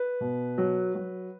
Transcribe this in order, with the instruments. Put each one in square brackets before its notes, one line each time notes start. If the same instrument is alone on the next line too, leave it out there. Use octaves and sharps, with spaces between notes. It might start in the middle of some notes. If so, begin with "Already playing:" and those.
Already playing: [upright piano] B4
B2
F#3
F#3